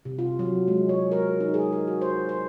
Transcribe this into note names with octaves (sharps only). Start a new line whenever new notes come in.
C3
F4
F#3
G#3
C#5
A#4
D#4
G#4
A#4
F#4
C5
C5